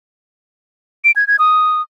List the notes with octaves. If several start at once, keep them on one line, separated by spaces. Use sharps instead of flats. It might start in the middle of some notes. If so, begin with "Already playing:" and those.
D7
G#6
G#6
D#6